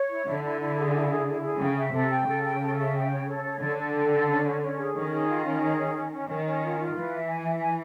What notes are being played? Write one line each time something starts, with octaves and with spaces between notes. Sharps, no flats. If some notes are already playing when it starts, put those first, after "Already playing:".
Already playing: C#5
E4
D3 E4
E4
E4
G#4
E4
G#4
E4
G#4
C#3 G5
E5
C3 A4
G5
C#3 A4
G5
A4
E5
G5
C#5
A4
C#5
D3 A4
A4
G5
A4
C#4
C#4
C#4
G#4
D#3 C#4
G#4
F4
C#4
G#4
C#4
C#4
C#4
D#3 C#4
C#4
F4
F4
E3 B4
E5
G#5
E5
G#5